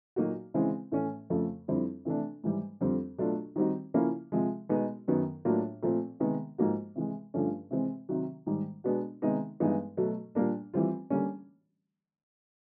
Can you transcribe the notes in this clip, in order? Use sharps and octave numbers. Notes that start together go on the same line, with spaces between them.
A#2 F#3 A#3 D#4 F#4
C#3 E3 G#3 C4 E4
A2 E3 A3 C#4
F2 C#3 F3 A3
F2 D3 G3 C4 E4
C3 E3 A3 D4
G#2 E3 G3
F2 D3 G3 C4 F4
B2 F#3 A3 D4 F4
D#3 G3 C4 D#4 F#4
C#3 F3 A#3 C#4 E4
C3 F3 G#3
B2 G#3 B3 D#4 F#4
F#2 D#3 F#3 B3
A2 F#3 A#3 D4 F4
A#2 F3 A3 C4
C3 D#3 G#3 B3
G#2 F3 A#3 D#4 F#4
C3 E3 G#3
G2 D3 F3 A3 C#4
C3 E3 G#3 C4
C3 D#3 F#3
G#2 D#3 G3
B2 G#3 B3 D4 F#4
C3 D#3 G#3 B3 D#4
G2 E3 G#3 B3 D#4
B2 F#3 A3
A#2 G3 A#3 D4
E3 G3 C4 F4
D3 G3 A#3 C#4